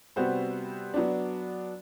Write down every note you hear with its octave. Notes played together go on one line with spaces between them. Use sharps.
C3 G3 B3 F#4 C5
F#3 B3 D4